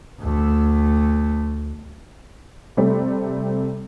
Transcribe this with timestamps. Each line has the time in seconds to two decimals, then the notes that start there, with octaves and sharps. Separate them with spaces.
0.20 D2 A3
2.77 C3 G3 A3 C4